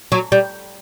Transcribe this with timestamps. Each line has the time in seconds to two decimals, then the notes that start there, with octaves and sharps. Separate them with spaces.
0.12 F#3
0.32 G3